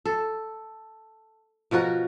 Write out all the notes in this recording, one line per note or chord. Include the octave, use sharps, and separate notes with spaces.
A4
B2 F3 F#4 A#4